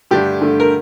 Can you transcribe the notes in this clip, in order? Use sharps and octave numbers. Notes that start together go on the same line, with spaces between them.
G2 D3 A3 D4 G4
G2 D3 A3
A#4